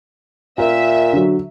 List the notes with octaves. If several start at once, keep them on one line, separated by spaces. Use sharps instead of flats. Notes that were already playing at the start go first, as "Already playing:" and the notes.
A#2 A#4 E5
D3 F#3